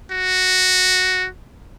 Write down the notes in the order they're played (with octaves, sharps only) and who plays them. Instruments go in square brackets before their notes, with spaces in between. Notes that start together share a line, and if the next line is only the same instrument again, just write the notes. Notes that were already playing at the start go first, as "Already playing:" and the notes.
[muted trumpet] F#4